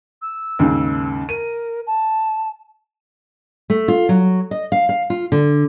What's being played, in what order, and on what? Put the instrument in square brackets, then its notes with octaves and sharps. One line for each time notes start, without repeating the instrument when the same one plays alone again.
[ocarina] E6
[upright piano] D#2 G#2 C#3
[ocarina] A#4 [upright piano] D#7
[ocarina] A5
[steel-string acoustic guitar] A3
F4
F#3
D#5
F5
F5
F4
D3